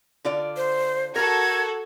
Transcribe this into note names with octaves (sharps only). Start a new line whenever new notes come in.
D3 F4 D5
C5
F#4 A4 A#4 G#6